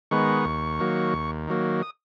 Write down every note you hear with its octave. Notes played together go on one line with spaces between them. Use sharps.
D#3 G#3 B3 C#6
D#2
D#3 F#3 A#3
D#2
D#3 F#3 A#3
D#6